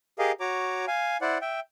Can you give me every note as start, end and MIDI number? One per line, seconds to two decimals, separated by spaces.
0.19 0.32 67
0.19 0.32 68
0.19 0.32 70
0.19 0.32 75
0.19 0.32 77
0.40 0.85 66
0.40 0.85 73
0.40 0.85 82
0.40 0.85 86
0.87 1.17 77
0.87 1.17 80
1.21 1.38 64
1.21 1.38 72
1.21 1.38 74
1.21 1.38 78
1.41 1.60 76
1.41 1.60 79